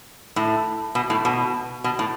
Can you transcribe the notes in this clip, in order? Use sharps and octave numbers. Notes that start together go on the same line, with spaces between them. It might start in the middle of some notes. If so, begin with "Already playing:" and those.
A2
B2
A2
B2
B2
A2